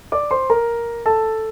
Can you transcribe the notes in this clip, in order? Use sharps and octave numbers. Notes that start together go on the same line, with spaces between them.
D5 D6
C5 C6
A#4 A#5
A4 A5